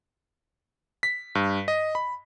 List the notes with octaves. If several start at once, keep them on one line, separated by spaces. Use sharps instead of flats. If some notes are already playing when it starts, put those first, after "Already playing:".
B6
G2
D#5
B5